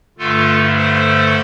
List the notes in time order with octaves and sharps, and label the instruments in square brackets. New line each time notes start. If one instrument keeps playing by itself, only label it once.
[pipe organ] G2 D3 A3 F4 A4
A4 C5